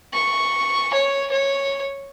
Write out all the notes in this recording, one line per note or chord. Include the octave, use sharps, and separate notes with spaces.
C#6
C#5
C#5